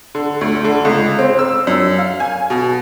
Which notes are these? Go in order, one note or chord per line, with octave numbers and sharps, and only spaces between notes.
D3
D2
D3
C#2
C4
E6
F#2
F5
G#5
B2